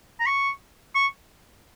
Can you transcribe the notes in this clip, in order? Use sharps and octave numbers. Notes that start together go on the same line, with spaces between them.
A#5
C#6
C#6